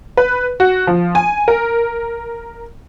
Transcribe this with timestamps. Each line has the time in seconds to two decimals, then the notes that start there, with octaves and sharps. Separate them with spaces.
0.17 B4
0.60 F#4
0.87 F3
1.15 G#5
1.48 A#4